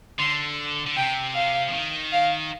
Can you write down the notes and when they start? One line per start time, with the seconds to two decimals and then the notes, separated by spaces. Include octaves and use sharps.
0.19 D3 C6
0.86 D3
0.96 C3 G5
1.34 F5
1.68 F3
1.73 D#3
2.12 F5